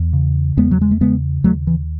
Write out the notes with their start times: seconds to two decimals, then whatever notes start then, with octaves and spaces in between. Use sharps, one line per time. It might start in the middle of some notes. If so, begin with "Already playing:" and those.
Already playing: E2
0.13 C#3
0.57 E2 G#3 B3
0.71 F#3
0.81 G#3
0.91 A3
1.01 C#3 G#3 B3
1.44 D#2 F#3 A3
1.67 E3